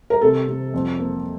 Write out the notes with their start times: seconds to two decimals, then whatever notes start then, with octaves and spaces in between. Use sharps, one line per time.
0.10 A#4
0.21 C3 A4
0.48 C3
0.74 F2
0.99 A#3